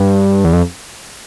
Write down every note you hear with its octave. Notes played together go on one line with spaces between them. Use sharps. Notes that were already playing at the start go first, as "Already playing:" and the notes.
Already playing: G2
E2
F2